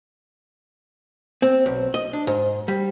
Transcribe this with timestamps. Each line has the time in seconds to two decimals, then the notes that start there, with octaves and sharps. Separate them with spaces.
1.42 C4
1.66 B1
1.94 D#5
2.13 D4
2.27 G#2
2.68 G3